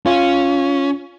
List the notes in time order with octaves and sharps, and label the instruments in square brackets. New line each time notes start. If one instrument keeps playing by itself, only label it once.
[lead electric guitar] C#4 [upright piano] F4